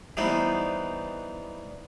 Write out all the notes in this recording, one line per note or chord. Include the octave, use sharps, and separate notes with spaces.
E3 G3 B3 D#4 C5